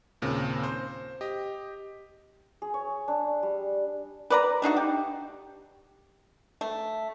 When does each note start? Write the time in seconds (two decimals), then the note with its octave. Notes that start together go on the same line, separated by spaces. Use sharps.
0.22 D#2 A#2 C#3 C4
0.64 C5
1.21 G4 D#5
2.62 G#4
2.74 C#5
3.08 D4
3.43 G3
4.30 B4 D5 A#5
4.62 A3 D4 D#4 F#4
4.76 G4
6.61 A3